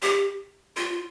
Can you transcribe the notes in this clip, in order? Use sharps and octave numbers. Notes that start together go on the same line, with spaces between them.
G4
F4